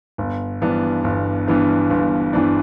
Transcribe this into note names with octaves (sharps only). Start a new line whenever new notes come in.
G1
G2 E3 B3 D4
G1
G2 E3 B3 D4
G1
G2 E3 B3 D4